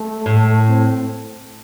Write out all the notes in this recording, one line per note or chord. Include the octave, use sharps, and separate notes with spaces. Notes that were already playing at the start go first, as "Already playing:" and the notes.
Already playing: A3
A2
C4